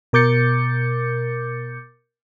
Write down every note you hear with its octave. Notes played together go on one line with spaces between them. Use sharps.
B2 A#4 D6 G6 A6 C#7